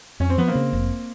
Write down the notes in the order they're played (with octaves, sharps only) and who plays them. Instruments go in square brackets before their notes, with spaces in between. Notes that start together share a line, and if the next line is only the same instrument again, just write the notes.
[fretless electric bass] F2 [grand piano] C#4
[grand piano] C4
[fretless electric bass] F3 [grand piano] B3
[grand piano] A#3 C4
[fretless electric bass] C#3
F1